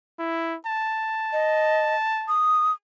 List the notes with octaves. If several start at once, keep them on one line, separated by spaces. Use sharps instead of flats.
E4
A5
D#5
D#6